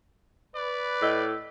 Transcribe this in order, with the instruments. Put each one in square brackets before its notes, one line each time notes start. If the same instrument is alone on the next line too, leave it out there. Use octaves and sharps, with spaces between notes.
[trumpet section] B4 [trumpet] D5
[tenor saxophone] A2 [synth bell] D#5 E6 B6